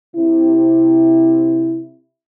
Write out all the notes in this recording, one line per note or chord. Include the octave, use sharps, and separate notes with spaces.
C3 E4